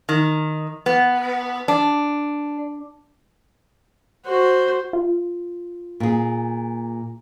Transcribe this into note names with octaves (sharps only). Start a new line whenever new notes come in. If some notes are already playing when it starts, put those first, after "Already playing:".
D#3
B3
D4
F#4 C5
F4
A#2 G#4